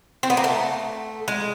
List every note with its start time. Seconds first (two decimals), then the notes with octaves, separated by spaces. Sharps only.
0.23 C4
0.30 B3
0.37 A#3
0.44 A3
1.28 G#3